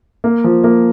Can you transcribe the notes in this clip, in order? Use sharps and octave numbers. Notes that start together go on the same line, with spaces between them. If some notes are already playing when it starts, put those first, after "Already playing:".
A#3
F3
A#3